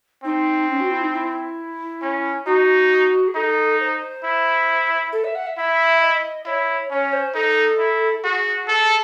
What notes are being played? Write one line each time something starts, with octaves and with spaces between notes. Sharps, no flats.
C4 D#4
C#4
F#4
E4
D#4
E4
C#4
D#4 F#4
G#4
D#4 A4
C5
E4
A4
E5
F#5
E5
E4 E5
D#5
E4 C#5
C#4 C#5
C5
D#4 A4
E4
F#4 G#4
A4